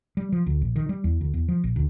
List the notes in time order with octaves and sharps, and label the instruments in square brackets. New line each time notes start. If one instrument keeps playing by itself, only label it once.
[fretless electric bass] G3
F3
D2
A#1
D#3
G3
E2
D2
E2
F3
A#1
D2